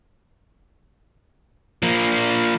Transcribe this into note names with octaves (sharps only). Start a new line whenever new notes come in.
F3 A#3